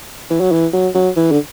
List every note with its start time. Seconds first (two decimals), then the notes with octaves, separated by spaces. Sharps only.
0.31 E3
0.40 F#3
0.52 E3
0.73 F#3
0.95 F#3
1.17 E3
1.32 D3